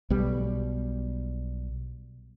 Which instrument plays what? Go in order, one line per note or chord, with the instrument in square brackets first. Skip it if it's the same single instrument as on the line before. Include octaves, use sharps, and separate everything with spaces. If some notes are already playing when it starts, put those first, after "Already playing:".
[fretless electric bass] B1 B2 G3